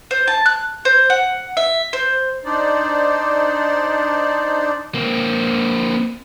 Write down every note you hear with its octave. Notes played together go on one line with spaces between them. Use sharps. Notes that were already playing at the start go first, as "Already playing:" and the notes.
C5
A5
F#6
C5
F#5
E5
C5
D4 D#4 C5 D5
A#3 C4